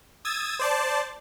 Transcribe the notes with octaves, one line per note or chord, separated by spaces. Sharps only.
D#6 E6 G#6 A6
C5 D5 A5